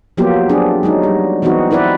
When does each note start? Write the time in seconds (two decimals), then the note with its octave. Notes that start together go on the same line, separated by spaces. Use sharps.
0.17 F3 F#3 A#3 B3 F4 G4
0.49 C4 D4 G#4
0.83 F#3 G#3 D#4
1.03 G3
1.42 E3 B3 C4 D#4 F#4
1.71 C4 E4 B4 D5